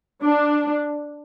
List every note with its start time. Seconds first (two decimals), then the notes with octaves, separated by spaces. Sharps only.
0.24 D4